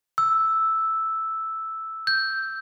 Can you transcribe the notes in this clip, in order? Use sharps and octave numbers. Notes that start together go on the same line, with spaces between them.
E6
G6